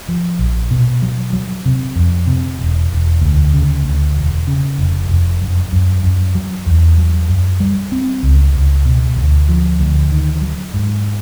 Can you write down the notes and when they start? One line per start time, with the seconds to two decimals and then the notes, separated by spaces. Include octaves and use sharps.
0.09 F3
0.39 A#1
0.71 B2
1.02 F#3
1.33 F#3
1.65 C3
1.96 F2
2.27 C3
2.59 E1
2.90 E1
3.21 D2
3.53 C#3
3.84 D2
4.16 E1
4.47 C#3
4.78 F1
5.09 F1
5.41 F#2
5.73 F#2
6.03 F#2
6.35 F#3
6.66 E2
6.98 F#3
7.29 F#2
7.60 G3
7.92 C4
8.23 C#2
8.54 C#2
8.86 B2
9.16 D2
9.49 F3
9.80 D2
10.11 D#3
10.42 F#3
10.74 G#2